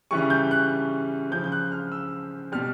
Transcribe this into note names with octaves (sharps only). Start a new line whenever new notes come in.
C#3 E3 G3 C#6
G6
F#6
C#3 F3 G6
G6
F#6
F6
E6
B2 G3 F6